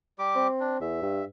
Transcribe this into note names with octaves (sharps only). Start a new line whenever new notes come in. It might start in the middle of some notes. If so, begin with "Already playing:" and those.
G3 G4 D6
C4
D4
E2 E5
G2